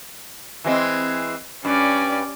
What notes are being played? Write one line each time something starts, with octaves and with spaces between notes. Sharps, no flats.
E3 G#3 C4
G2 C#4 D5